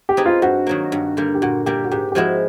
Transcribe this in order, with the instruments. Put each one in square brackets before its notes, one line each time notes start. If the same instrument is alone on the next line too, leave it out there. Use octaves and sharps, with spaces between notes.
[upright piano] G4
[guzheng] C4 D#4 G#4 B4
[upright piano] F4
[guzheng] G2 [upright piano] F#4
[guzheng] D#3 F#3 A#3
G2
D3 G3 A#3
[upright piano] G4
[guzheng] A#2 [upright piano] F#4
[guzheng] G3 A#3 [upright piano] G4
[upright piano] F#4
[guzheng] G#2 [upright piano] G4
[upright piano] G4
[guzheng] F3 G#3 C4 E4 [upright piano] F#4